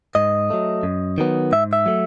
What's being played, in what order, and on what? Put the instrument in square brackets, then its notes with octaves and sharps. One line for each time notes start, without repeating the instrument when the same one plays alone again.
[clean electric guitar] G#2 D#5
F#3 A3
F#2
D#3 F#3 B3
G#2 E5
E5
F#3 A3